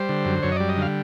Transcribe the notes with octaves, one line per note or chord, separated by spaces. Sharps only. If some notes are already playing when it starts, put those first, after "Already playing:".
Already playing: G3 C5
D3
F#2
F#2 C#5
D#5
G3 D5
D#5
D3 F5